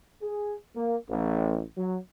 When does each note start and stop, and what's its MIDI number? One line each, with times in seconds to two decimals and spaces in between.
0.23 0.56 68
0.76 0.96 58
1.09 1.61 33
1.77 1.97 54